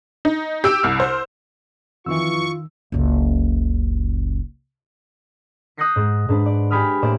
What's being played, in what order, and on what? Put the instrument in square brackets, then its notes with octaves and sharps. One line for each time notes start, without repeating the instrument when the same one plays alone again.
[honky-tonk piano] D#4
G4 E6 D7
C2 F6
C5
[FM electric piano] F2 E3 [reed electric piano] D#3 E6 [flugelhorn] F4 [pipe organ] C#6
[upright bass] F#1 C#2
[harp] D#6 F#6 G6 A#6 C7 C#7
G#2
G#2 D4 B4 C5
D5
G4 G#5 B5 D#6 F6
A2 A#3 C5 D5 E7